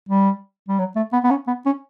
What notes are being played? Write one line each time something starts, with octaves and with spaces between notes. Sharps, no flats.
G3
G3
F#3
A3
B3
B3
C#4
B3
C#4